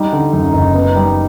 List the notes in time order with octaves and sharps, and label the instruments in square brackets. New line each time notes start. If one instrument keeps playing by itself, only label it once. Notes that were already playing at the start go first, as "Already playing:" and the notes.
Already playing: [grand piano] G3 [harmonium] D#4
[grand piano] D3
F#2
F#1
B3
G3